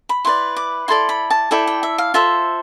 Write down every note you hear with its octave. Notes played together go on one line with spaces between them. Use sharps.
B5
E4 B4 D5 C6
D6
E4 A4 D5 C6
B5
A5
E4 A4 D5 G5
G5
E5
F5
F4 A4 C5 E5